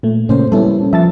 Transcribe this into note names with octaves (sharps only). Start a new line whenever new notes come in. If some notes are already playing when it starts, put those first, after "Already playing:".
A#2 A3
A#2 C#3 A#3 C#4 C5
G3 B3 C#4 E4 A4
F3 E5 A5 A6